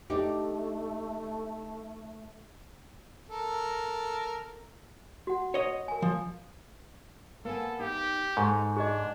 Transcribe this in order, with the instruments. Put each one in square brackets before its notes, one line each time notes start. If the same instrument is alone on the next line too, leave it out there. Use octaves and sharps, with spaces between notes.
[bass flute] A3 [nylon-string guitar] D4 D#4 G4
[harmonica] A4 A#4
[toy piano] F#4 F#5
[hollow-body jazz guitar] C#5 D#5
[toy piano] A#4 G#5
[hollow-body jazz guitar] F3
[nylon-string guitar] A#3 B3 G#5 [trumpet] A4
[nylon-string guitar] D#4 [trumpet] G4
[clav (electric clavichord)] G#2 [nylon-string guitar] G#3 D#4 A4 [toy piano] G#5 C#6
[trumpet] D4 [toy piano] G#4 D#5